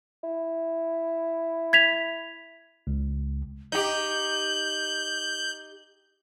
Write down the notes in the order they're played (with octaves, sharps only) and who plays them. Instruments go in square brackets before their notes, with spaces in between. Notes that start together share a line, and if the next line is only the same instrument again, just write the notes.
[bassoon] E4
[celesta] G#6 B6 F7
[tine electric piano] C#2
[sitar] D#4 G4 [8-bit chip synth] G6 [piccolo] F#7